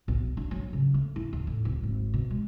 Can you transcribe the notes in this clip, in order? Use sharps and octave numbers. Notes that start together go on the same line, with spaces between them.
B1
D4
F#3
C#3
A3
E4
D#2
A2
D1
G#1
B2
G#3